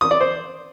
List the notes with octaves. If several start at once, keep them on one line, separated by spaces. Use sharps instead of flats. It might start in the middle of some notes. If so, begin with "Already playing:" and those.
D#6
D5
C5